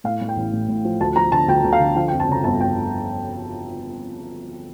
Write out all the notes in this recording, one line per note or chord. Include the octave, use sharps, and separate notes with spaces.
A2 F5
A2
G5
A1
A2
A2
F3
D2 A5
F3 A#5
D3 A5
D2 G5
D2
F5
D3
F3 F5
G5
F2
A5
C#3 A#5
G1 A5
G1 G5